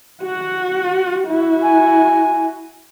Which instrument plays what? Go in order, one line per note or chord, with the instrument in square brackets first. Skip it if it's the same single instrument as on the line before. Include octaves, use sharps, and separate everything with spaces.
[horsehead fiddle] F#4 F#5
E4 F#4
[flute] G#5